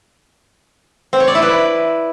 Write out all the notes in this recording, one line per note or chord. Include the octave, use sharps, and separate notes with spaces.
C4
C#5
D5
E4
B4